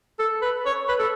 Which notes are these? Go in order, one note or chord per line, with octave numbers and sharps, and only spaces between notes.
A4
B4
C#5
B4
A4